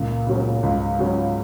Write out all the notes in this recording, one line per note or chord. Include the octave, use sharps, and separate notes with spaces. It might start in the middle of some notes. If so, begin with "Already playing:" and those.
Already playing: C#2 A#2
C#3 F#3 C#4
C#2 G#2
C#3 F#3 C#4